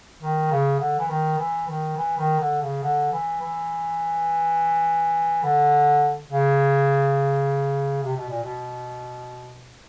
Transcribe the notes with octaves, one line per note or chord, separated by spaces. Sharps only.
D#3
C#3
D3
E3
D#3
E3
D#3
E3
D#3
D3
C#3
D3
E3
E3
D3
C#3
C3
B2
A#2
B2